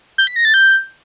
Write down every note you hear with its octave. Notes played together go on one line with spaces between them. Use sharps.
G6
B6
A#6
A6
G6